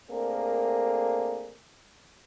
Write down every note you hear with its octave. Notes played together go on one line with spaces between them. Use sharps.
A3 A#3 C4 D4 G#4 A#4